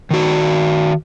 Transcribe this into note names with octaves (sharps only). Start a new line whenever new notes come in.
D#3 F#4